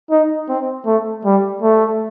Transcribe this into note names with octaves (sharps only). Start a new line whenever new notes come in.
D#4
C4
A3
G3
A3